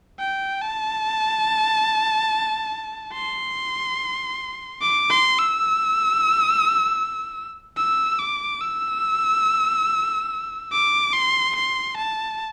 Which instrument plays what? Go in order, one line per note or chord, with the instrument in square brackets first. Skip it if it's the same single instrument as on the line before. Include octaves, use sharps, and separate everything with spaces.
[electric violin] G5
A5
C6
D6
C6
E6
E6
D6
E6
D6
C6
C6
A5